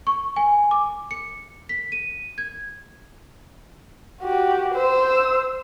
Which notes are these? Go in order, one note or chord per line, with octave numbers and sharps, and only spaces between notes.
C#6
G#5
D6
C#7
B6
D#7
G#6
F#4 G4
C5 E6